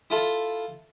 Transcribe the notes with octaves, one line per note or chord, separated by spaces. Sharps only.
E4 F4 A4